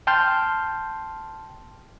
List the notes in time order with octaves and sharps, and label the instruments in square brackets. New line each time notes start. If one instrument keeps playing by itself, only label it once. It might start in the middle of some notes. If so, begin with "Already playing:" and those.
[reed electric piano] G5 A5 C6 F6 G6